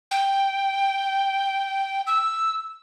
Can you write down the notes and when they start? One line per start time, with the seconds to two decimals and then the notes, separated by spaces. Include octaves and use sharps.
0.11 G5
2.07 E6